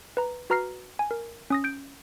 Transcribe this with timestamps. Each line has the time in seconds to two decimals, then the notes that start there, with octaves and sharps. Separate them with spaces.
0.17 B4 A#5
0.50 F#4 B4 A#5 F6 A#6 C7
0.99 G#5
1.11 A#4
1.50 C#4 D#6 A#6
1.64 G6 D7